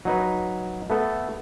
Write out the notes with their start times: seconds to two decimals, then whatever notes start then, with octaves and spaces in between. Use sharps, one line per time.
0.05 F#3 D#4 B4
0.90 A3 B3 A4